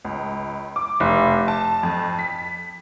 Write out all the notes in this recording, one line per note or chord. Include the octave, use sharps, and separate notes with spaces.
C#2
D6
F1
A5
F2
B6